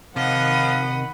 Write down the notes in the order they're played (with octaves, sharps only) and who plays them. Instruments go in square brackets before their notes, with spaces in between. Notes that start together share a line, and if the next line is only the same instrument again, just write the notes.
[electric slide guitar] C3 [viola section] D#3 F#5 B5 [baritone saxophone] F3 [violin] D#5 D#6